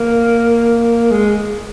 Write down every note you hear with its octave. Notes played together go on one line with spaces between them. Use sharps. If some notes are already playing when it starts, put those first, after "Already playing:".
Already playing: A#3
G#3